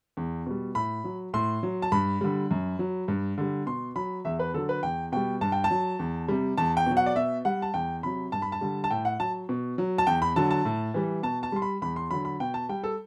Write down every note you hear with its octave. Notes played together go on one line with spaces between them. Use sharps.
E2
B2 G3
A2 B5
F#3
A2 C6
F#3
A5
G2 B5
D3 G3
F#2
F#3
G2
D3 G3
B2 C6
F#3 B5
E2 E5
B4
D3 F#3 A4
B4
E2 G5
B2 G3 G5
G2 A5
G5
A5
F#3
E2
C3 G3
E2 A5
G5
B2 F#3
F#5
D5
B2 E5
G3 F#5
A5
E2 G5
C3 F#3 B5
G2 A5
B5
A5
D3 G3
A5
A2 G5
F#5
F#3 A5
B2
F#3
A5
E2 G5
B5
D3 F#3 A5
A5
A2
E3 G3
B2 A5
A5
G3 C6
B5
E2 B5
C6
D3 F#3 B5
B5
B2 G5
A5
G3 G5
A4